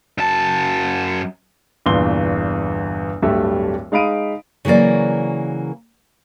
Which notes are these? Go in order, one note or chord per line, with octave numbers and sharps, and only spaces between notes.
F#2 A5
G1 E2 A#2 C6 G7
D1 G2 G3 A3 E5
G#3 D#4 F5 B5 D7 D#7
C#3 E3 F#3 A#3 D5